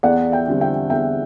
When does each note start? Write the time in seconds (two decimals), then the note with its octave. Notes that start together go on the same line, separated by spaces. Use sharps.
0.03 E2 D5 F#5
0.32 E5 G5
0.47 D3 G3 C4
0.61 E5 G5
0.90 E2 E5 G5